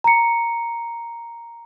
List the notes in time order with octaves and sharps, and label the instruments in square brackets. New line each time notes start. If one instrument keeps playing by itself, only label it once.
[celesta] A#5 C#7